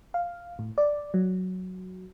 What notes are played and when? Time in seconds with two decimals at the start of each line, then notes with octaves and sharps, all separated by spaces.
0.14 F5
0.59 A2
0.78 D5
1.14 F#3